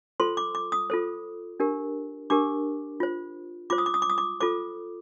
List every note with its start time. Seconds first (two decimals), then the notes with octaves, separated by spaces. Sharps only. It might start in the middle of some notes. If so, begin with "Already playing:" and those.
0.20 F4 A4 C5 C6
0.37 D6
0.55 D6
0.72 D#6
0.90 F4 A4 C5
1.60 D4 G4 A#4
2.30 D4 G4 A#4 D6
3.00 F4 C5
3.70 F4 C5 D6
3.78 D#6
3.86 D6
3.94 D#6
4.02 D6
4.10 D#6
4.18 D6
4.40 F4 A4 C5 D6